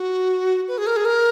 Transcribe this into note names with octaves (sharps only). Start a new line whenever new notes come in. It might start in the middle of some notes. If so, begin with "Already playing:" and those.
Already playing: F#4
B4
G#4
A#4
G#4
A#4